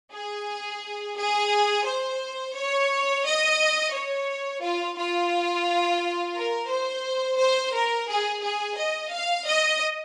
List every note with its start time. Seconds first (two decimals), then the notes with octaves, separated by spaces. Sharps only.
0.13 G#4
1.17 G#4
1.86 C5
2.56 C#5
3.25 D#5
3.94 C#5
4.62 F4
4.97 F4
6.35 A#4
6.70 C5
7.39 C5
7.74 A#4
8.08 G#4
8.43 G#4
8.78 D#5
9.12 F5
9.46 D#5